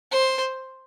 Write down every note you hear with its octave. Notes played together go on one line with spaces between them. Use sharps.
C5